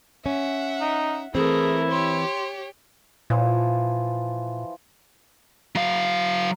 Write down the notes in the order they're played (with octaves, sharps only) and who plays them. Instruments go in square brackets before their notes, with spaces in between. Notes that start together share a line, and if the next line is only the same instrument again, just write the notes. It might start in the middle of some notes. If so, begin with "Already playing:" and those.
[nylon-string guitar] C#4 [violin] E5 F#5
[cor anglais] D#4
[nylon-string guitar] E3 C4 [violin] A3 A#4 [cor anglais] E4 [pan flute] G#4
[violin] G4 C#5 [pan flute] C6
[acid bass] A#2 [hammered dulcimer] E3 F3
[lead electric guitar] F#3 F5